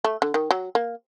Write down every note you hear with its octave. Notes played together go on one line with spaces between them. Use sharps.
A3
D3
D#3
F#3
A#3